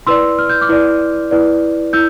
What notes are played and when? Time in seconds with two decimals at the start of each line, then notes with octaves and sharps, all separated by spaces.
0.07 E4 B4 D5 C6 E6
0.39 F6
0.49 G6
0.61 D6 F6
0.69 E4 B4 D5
1.31 E4 B4 D5
1.93 E4 E6 G6